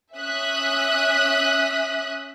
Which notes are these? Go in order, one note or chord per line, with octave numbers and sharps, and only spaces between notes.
C#4 E5 D#6 F#6 B6